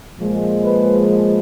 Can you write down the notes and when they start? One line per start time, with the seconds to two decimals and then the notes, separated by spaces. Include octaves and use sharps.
0.18 A#2 F3 G#3
0.65 B4